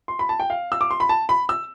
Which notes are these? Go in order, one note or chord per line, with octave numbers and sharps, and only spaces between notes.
C6
B5
A5
G5
F5
E6
D6
C6
B5
A5
B5
E6